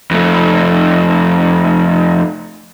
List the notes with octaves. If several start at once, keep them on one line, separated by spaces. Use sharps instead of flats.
F2 A3